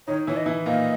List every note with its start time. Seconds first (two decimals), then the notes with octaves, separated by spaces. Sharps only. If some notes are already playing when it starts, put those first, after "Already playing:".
0.07 D#3 D#4 C#5
0.27 E3 E4 C#5
0.37 D#5
0.46 E3 E4
0.66 A#2 A#3 D#5